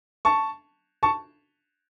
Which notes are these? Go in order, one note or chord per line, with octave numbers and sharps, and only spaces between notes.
A5 C#6
A5 C#6